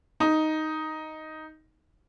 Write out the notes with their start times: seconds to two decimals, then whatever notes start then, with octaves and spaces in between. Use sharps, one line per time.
0.20 D#4